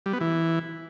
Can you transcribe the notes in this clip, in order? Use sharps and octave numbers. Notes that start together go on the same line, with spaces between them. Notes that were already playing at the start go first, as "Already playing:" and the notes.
G3
B3
E3